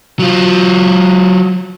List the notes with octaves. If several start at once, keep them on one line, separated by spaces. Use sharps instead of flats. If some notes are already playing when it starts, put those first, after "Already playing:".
F#3 F4